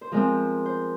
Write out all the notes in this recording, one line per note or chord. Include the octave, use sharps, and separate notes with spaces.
C5
F3 G#3 C4 A#4
C5